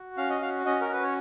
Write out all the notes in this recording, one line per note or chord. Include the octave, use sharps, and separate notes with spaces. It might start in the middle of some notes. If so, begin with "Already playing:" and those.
Already playing: F#4
C#4 F5
D#5
F#4 F5
C#4 D#5
A#4
F#4 B4
C#5